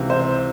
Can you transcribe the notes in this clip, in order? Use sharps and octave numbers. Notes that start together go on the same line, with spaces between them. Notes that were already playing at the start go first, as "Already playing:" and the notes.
Already playing: C#2 C3 E3
C5